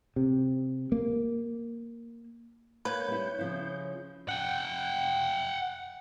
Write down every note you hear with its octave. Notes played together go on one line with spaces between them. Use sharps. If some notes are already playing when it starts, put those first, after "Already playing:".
C3
A#3
A#3 B4 C#5 G6
G3 E4
C#3 F3 E4
F#5 G5